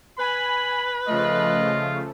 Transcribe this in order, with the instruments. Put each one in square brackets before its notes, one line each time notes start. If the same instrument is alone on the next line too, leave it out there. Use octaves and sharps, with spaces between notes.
[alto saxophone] B4 [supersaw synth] G#5 [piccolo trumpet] B5
[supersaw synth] C#3 F3 A3 [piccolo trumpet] F4 [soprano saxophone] D#5